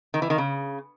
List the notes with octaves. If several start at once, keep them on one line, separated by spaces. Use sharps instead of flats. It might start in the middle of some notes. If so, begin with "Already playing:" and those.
D#3
E3
D#3
C#3